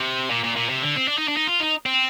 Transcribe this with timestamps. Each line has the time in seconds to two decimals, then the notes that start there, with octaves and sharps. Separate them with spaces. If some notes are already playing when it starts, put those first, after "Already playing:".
Already playing: C3
0.30 A#2
0.44 A#2
0.56 A#2
0.69 C3
0.82 D3
0.96 C4
1.08 D4
1.18 D#4
1.28 D4
1.37 D#4
1.47 F4
1.60 D#4
1.86 C4